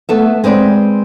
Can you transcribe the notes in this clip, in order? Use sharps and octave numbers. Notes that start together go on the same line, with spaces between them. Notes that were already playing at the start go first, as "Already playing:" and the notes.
A3 B3 A4 E5
G#3 C4 B4 D5